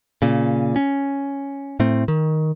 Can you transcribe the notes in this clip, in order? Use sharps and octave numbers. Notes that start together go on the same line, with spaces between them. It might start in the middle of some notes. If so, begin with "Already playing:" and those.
A#2 C#3
C#4
A2 A3 C4
D#3